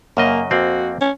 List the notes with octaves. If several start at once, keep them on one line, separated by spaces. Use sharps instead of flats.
F#2 C#3 A#3 D#5
F2 A#3 C4 F#4
C#4